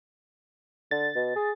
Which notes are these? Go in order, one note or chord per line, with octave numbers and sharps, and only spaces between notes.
D3 A6
B2
G#4